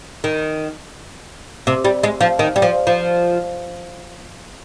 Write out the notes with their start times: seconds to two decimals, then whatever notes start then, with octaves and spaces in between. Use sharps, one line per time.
0.24 D#3
1.67 C3
1.84 G3
2.03 G#3
2.21 F3
2.39 D#3
2.56 G3
2.62 F3
2.87 F3